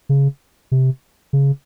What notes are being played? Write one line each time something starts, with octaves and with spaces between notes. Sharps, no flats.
C#3
C3
C#3